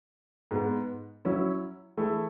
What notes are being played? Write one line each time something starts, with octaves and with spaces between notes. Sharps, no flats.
G#2 G#3 B3
F#3 C#4 E4
E3 A3 E4 G#4